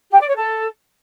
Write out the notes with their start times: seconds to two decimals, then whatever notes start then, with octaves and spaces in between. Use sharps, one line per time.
0.11 G4
0.19 D5
0.28 C#5
0.36 A4